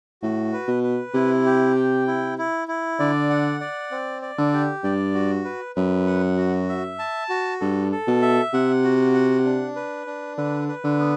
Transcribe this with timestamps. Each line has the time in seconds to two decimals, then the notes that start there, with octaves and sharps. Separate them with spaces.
0.22 A2 F#4
0.53 B4
0.68 B2
0.83 B4
1.14 C3 E4
1.46 G4
1.76 G5
2.07 E4
2.38 E4
2.68 E4
2.99 D3 D5
3.30 F#5
3.61 D5
3.91 C4
4.22 D5
4.38 D3
4.53 G4
4.84 G2 D5
5.14 F#4
5.45 B4
5.75 F#2 B4
6.07 F#5
6.37 F#4
6.69 E5
6.99 A5
7.29 F#4
7.60 G2 A4
7.92 A4
8.07 B2
8.22 E5
8.53 C3 F#5
8.84 F#4
9.14 F#5
9.45 D4
9.76 B4
10.06 D4
10.37 D3 B4
10.68 B4
10.84 D3
10.99 B3